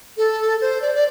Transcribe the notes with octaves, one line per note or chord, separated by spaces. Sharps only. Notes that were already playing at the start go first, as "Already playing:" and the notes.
A4
C5
D5
D5